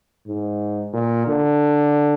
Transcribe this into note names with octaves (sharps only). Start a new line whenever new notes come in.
G#2
A#2
D3